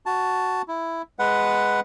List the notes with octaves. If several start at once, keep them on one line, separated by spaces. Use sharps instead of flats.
F#4 A5
E4
G#3 B4 F#5